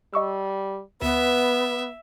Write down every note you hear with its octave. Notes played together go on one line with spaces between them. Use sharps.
G3 D#5 C#6 E6
D2 B3 B4 E5